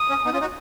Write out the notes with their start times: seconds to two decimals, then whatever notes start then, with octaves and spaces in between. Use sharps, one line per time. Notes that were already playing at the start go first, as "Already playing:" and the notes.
Already playing: D#6
0.09 C#4
0.25 B3 D#4
0.33 C#4 F4
0.41 D#4 F#4